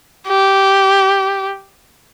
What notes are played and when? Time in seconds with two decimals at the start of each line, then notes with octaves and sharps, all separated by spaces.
0.28 G4